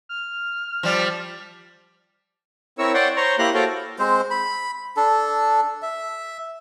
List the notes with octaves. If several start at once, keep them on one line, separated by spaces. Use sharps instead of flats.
F6
F3 G3
C4 E4 A#4 C#5 C#6 E6
C#5 D5 F#5 G5 C6
C5 C#5 A#5 C6 C#6
A#3 E4 G4 A#5 C6 F#6
F#4 A4 C5 C#5 F5 G5
G#3 C4 C5
B5
D4 A4
E5